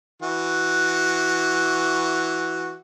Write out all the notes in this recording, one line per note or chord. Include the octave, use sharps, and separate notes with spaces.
E3 F#4